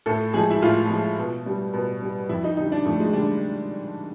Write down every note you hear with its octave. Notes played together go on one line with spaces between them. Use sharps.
A2 A4
F3 G#3 G#4
E4
A2 F4
F3 G#3
B2
G3
B2
G3
F2 E4
D#4
D3 G3 D#4
D4
F2 A3
G#3
D3 G3 D4